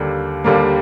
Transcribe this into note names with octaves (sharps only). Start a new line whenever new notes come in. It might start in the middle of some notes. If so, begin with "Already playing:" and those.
Already playing: D#2 D3 G3 A#3
D#2 D3 G3 A#3